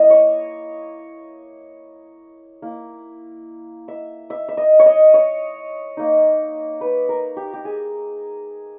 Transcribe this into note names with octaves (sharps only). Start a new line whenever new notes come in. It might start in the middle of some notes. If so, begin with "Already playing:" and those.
Already playing: A#3 E4 D#5
C#5
A#3 E4
E5
E5
E5
D#5
C#5
D#5
C#5
A#3 D#4
B4
A#4
G4
G4
G#4